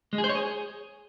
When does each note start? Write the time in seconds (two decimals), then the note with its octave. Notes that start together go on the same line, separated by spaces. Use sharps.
0.13 G#3
0.18 G#4
0.24 C5
0.29 C#5
0.35 G#4